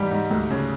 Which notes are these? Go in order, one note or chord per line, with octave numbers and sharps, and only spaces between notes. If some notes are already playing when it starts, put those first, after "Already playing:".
Already playing: G#2 E3 G3 G4
G#2
D2
C#3